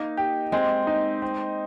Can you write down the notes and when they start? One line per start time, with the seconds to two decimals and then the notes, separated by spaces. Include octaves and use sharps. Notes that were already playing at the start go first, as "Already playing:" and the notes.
Already playing: A#3 D#4
0.17 G4
0.52 G#3 C4
0.87 D#4
1.22 C4